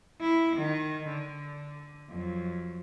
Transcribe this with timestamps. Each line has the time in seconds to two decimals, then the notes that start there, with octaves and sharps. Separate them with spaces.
0.21 E4
0.57 D#3
1.08 D3
2.09 F2 F#3